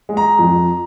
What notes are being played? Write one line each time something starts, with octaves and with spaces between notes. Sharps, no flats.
G#3
A#5
F2